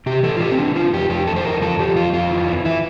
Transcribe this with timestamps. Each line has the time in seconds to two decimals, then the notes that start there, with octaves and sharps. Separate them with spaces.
0.06 C3 G4
0.23 E3 A4
0.36 F4
0.40 E3 G4
0.51 C4
0.58 E3 D4
0.76 E3 F4
0.93 F2 G4
1.10 F2 G4
1.27 E3 A4
1.36 C5
1.44 F2 A#4
1.62 F3 A4
1.79 F3 G4
1.96 F2 F4
2.13 F2 F4
2.31 E3
2.48 E3
2.65 E3 E4